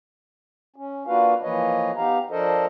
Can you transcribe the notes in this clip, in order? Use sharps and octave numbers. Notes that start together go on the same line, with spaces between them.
C#4
A#3 D4 F4 F#4 B4 F5
E3 F3 A#3 B4 C#5 D#5
B3 D#4 G4 F5 A#5
F3 D4 A4 A#4 C5 D#5